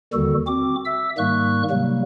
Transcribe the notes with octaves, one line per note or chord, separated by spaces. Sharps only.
D#2 D3 D#3 G3 F#4 A4
C4 F#4 D6
E5 E6
G#2 D#3 G3 A#3 C#6 F#6
C3 F#3 G3 A#3